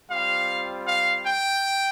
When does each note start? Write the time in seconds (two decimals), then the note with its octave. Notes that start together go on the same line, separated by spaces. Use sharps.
0.10 G3 C4 F4 F5
0.88 F5
1.25 G5